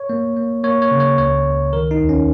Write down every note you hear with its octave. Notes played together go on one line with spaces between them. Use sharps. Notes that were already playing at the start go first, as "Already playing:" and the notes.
Already playing: C#5
A#3
A#3
A#3 C#5
C#5
C#3
C#5
C#2 C#5
C#2
D#3 A#4
D#4
D#2
C#4